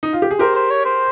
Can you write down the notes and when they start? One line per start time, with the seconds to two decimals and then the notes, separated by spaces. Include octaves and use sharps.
0.03 D#4
0.13 F4
0.22 G4
0.31 G#4
0.39 G4 A#4 C5
0.55 C5
0.70 C#5
0.85 C5